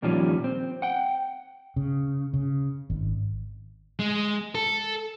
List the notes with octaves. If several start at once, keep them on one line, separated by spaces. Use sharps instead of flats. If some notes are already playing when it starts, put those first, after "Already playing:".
D#2 A#2 D#3 F3 G3 C#4
C4
F#5 G5
C#3
C#3
G#1
G#3
A4